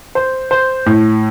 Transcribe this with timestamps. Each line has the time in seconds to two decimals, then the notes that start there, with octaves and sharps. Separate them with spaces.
0.15 C5
0.51 C5
0.86 A2